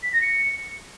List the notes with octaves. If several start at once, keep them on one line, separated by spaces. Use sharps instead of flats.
B6
A#6
C#7